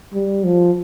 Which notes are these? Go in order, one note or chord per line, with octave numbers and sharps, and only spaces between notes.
G3
F3